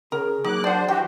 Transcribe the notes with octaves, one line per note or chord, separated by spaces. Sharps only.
C#3 G#4 A#4
F#3 A#3 D#4 D6 F#6
D4 C5 D5 F#5
E3 F#4 G4 F#5 G5